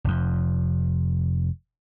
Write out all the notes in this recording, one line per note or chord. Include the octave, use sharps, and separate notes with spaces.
F1 F2